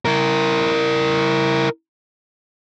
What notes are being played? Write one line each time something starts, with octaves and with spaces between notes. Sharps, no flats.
E4 A#4